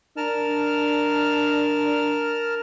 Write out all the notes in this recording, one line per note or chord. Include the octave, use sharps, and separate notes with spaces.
D4 A#4 A5 F6